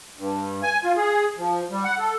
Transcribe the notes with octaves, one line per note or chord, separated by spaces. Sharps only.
G2
G#5
F4
G#4
F3
G3
F#5
A4